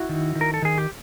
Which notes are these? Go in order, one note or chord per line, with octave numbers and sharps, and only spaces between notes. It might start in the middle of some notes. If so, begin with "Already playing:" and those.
Already playing: E4 F#4
D#3
D#3
A#4
A4
D#3 G#4
G4